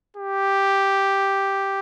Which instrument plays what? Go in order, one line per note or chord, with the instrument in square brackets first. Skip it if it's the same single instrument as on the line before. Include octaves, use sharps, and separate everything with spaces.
[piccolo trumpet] G4